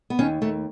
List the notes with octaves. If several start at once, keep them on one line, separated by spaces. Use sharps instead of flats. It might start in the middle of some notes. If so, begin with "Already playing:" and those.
B3
D#2 C#4
D#2 A3